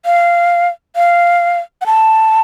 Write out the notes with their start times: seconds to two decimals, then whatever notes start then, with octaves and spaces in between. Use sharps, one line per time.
0.05 F5
0.96 F5
1.81 F#5
1.86 A5